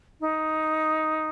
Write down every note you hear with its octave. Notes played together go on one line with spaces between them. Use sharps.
D#4